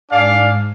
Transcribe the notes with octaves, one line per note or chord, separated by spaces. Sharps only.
G#2 D4 G#4 D5 F5